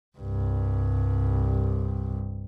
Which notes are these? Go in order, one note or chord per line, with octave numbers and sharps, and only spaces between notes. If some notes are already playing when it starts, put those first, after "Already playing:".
C2 G2